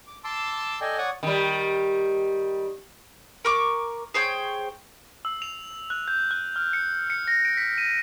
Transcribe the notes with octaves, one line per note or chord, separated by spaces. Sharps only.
D6
A5 C6 D6 E6
A4 D5 D#5 G5 G#5
C#5 D5 F#5 C#6 D#6
D#3 G3
A#4 C#6 D6
G#4 C5 C#5 G5
E6
F7
F#6
G6
F#6
F6
C#7
C#7
A#6
D7
B6
D#7